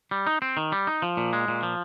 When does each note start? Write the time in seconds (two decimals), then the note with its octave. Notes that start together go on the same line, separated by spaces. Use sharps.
0.11 G3
0.27 D#4
0.42 C4
0.57 D#3
0.72 G3
0.87 D#4
1.02 F3
1.17 A#2
1.33 G#3
1.48 A#2
1.63 F3